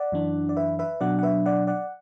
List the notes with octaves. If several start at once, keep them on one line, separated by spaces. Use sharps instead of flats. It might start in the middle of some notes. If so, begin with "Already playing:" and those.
Already playing: D5 F#5
F#2 E3 D4
D5
B4 E5
B4 E5
B2 F#3 D4 D5 F#5
F#5
B4 E5
D5 F#5
D5 F#5